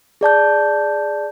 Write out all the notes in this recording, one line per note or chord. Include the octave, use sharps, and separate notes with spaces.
G#4 D5 A5 G6